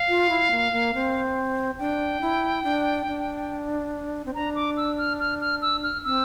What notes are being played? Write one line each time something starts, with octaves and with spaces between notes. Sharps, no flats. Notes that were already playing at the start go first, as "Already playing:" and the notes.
Already playing: F5
F4
E4
A#3
A#3
C4
D4 G5
E4
D4
D4
C4
D4 A#5
D6
E6
F6
F6
F6
E6
F6
C4 E6